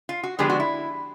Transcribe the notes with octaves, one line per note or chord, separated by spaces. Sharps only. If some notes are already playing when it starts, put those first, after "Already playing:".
F4
F#4
D3 F3 G#3 B3 G4
F#4
E4